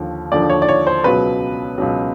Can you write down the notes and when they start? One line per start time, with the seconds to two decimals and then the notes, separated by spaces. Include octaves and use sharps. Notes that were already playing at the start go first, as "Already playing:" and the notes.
Already playing: D#2 D3 F3
0.32 D#2 D3 F3 D5
0.50 C#5
0.62 D5
0.69 C#5
0.87 C5
1.04 C#2 B2 F#3 B4
1.78 C#2 B2 F#3